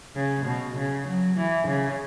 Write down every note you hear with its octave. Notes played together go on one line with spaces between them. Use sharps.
C#3
B2
C#3
F#3
E3
C#3